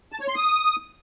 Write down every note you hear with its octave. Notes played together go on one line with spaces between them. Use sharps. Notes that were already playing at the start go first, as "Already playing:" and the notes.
A5
C#5
C6
D#6